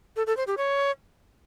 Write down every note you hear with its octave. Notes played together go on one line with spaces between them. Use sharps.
A4
A4
C5
G4
C#5